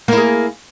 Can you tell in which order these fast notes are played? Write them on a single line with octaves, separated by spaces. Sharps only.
A#3 E4 G#4